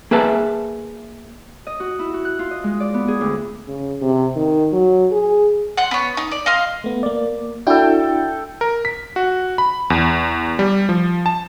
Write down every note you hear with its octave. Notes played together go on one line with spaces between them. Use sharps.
A#3 G#4 B4 E5 A5
D#5
F#4
E4
F#4
F#6
F4
D#5
G#3
D5
B3
G#4
D2
C#3
C3
D#3
F#3
G#4
F#5 C6
B3 C#5
D#4
D5
D#5 F5 C6
A3 B3
A#3 D5
D4 E4 F#4 A4 G5
A#4
B6
F#4
B5
E2
G3
F3
A5